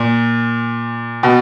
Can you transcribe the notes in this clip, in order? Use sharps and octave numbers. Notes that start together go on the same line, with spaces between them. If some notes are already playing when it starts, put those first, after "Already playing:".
Already playing: A#2
B2